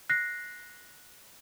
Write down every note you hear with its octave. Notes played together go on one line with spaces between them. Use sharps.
F#6 A#6 C7